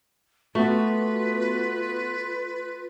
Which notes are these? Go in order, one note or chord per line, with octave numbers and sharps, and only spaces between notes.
A3 B3 F4 F#4 B4